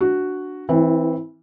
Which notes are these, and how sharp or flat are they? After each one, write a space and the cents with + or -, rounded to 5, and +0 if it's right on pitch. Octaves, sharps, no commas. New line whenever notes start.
D4 +0 F#4 +0
E3 -20 C4 +0 E4 +15